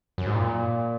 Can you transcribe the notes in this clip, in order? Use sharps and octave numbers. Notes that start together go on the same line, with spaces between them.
F#2
G#2
A#2